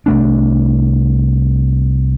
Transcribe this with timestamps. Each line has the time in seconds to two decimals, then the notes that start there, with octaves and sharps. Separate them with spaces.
0.06 C2 A3 D4